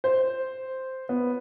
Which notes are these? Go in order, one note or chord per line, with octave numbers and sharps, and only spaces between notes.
C5
B3